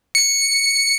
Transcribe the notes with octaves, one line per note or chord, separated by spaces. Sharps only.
C#7